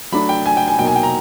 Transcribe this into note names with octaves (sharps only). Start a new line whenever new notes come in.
F#3 A3 D4 B5
G5
G#5
G5
G#5
B2 F#3 A#3 D#4 G5
G#5
G5
A#5